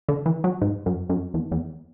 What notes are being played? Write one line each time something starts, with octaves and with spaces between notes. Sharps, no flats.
D3
E3
F#3
G#2
F#2
F#2
E2
E2